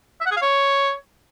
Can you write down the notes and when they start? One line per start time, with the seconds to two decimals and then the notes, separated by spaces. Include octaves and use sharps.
0.21 E5
0.26 F#5
0.31 G#4
0.37 F5
0.42 C#5